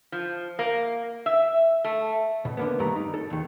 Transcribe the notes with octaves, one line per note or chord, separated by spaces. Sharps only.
F3
A#3
E5
A3
B2
D3 A#3 B3
G2 D#3 A3 G4 A#5
D#4
A4
D#2 D#3